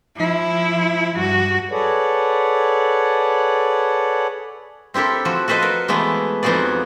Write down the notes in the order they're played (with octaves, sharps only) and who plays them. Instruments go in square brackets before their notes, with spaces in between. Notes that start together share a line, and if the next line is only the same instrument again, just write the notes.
[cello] F3 E4
G2 F#4
[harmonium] G#4 A4 B4 C#5 D5 F#5
[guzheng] C4 E4 G4 A4 A#4
F3 F#4
F#4 A4 B4 C5 D#5
A#4
E3 G#3 A3 B3 E4
F2 B3 D#4 F#4 G#4 D5